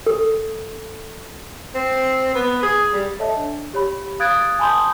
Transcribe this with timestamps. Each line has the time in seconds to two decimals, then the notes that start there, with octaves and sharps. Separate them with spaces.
0.06 A4
1.75 C4
2.35 B3
2.63 G#4
2.93 G3
3.19 A4 C#5 D#5 E5 A5
3.37 D4
3.73 G4 C#5 B5
4.20 F5 D#6 F#6 G#6 A6 D7
4.59 G#5 A5 B5 C6 D#6 G6